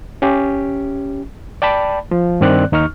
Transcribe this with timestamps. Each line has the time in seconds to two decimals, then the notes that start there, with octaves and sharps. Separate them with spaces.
0.22 C#4 G4
1.62 D5 G5 A5 B5
2.11 F3
2.41 G2 D#3 C4 D5 F#6
2.72 D#2 D#4 C#6 F6